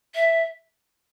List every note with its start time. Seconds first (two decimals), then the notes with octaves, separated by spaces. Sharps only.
0.15 E5